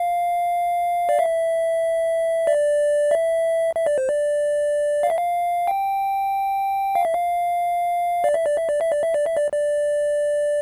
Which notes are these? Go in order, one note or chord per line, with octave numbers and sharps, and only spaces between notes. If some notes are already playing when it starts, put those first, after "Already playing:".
Already playing: F5
D5
E5
D5
E5
E5
D5
C5
D5
F5
E5
F5
G5
F5
E5
F5
D5
E5
D5
E5
D5
E5
D5
E5
D5
E5
D5
D5